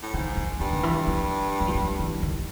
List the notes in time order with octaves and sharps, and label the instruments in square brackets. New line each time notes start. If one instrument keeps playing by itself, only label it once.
[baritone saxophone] A2
[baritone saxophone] G#2 [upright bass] D#3
[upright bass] D#3
[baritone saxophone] G2 [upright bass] D#3
[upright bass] D#3
E3
F3
F#3
F3
F#3
E3
D#3